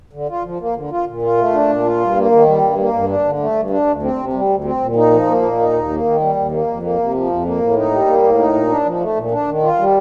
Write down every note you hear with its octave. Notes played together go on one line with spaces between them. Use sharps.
D3
F4
F3
A#3
D3
F4
A#2
F4
A3
D4
A#2
F4
G2
A#3
D#3
G3
G2
A#3
G2
D4
D3
A3
G2
D4
D2
C4
C3
G3
D2
C4
A#2
D#4
F3
A#3
A#2
D#4
D#2
A#3
D#3
G3
D#2
A#3
F2
A#3
C3
F3
F2
A#3
A2
D#4
G3
A#3
A2
D#4
A#2
D4
F3
A3
A#2
D4
D#3
F4
G3